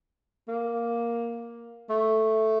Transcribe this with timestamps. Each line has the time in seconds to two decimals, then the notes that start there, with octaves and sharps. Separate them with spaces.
0.48 A#3
1.89 A3